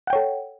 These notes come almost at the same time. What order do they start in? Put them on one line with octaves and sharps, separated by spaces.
F#5 G5 C#5 A4